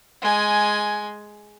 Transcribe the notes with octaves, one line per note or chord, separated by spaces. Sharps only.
G#3 G#5